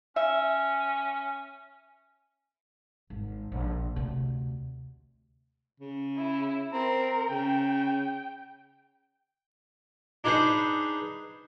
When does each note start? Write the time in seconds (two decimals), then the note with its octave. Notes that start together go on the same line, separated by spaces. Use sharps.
0.16 C#4 E5
3.10 G#1
3.52 A#1
3.96 D2 C3
5.80 C#3
6.17 E4
6.73 C4 A#4
7.31 C#3 G5
10.24 D4 D#4 G#4 B4 C5